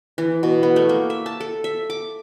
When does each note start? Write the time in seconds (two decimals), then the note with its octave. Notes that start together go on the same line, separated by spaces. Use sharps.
0.18 E3
0.43 B2
0.63 B3
0.76 A3
0.89 A#3
1.10 E5
1.26 A5
1.40 A4
1.64 E5
1.90 D6